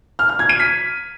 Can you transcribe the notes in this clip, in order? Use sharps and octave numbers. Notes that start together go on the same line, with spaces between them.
F6
F6
G#6
D#7
B6